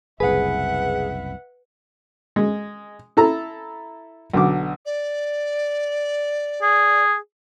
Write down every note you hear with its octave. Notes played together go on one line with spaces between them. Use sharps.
F#1 C2 G#4 B4 E5 F#5
G#3
E4 A4 A#5
B1 D3 D6
D5
G#4